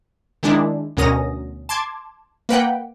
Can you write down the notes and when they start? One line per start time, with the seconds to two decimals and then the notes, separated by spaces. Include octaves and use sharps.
0.43 D#3 G#3 D4 E4
0.97 D2 B2 C#4 A#4 D#6 A#6
1.69 A5 C6 D6 G#6
2.49 A#3 B4 F#5 G5